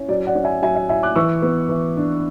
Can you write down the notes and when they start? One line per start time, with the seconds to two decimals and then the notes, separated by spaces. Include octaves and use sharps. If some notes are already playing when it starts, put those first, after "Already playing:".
Already playing: C#4 E4
0.08 F#3 D5
0.27 D5 F#5
0.35 C#4
0.44 E5 G#5
0.62 F#3 E5 G#5
0.76 E5
0.89 E4 E5 G#5
1.03 D6 F#6
1.16 E3 C#6 E6
1.42 B3
1.69 E3
1.97 D4